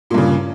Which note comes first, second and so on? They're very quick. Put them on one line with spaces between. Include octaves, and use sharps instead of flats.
A#2 G2 C#3